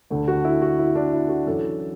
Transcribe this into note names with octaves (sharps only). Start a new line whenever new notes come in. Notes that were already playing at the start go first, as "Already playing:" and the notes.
D2 D3
F#4
E4
F#4
E4
D4
E4
F#4
F#2 E3 A4